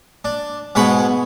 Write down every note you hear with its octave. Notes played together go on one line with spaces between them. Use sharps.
D4
G#2 B2 G#4 C#5 B5